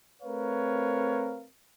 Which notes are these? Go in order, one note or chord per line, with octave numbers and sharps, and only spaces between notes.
A3 C4 A#4 B4 C#5 F5